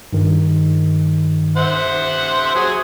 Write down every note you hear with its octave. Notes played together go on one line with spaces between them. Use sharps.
G2 D#3
C5 E5 F#5
F#3 F#4 G#4 G#5